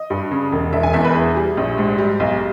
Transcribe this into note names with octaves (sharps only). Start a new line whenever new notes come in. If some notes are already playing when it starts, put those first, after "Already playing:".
Already playing: D#5
G2
C#3
E1
E1 E5
G#5
E2 E5
B4
E3 G#4
G3
A#1
G#2
G3
B1